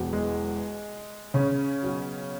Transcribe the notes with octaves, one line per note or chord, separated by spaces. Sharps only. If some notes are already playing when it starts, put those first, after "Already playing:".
Already playing: E1 E2 B2 F#3
G#3
C#3 C#4
B1 B2 F#3